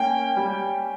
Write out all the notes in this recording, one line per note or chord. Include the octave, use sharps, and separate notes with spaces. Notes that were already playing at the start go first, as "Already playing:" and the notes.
Already playing: A#3 C#4 G5
G3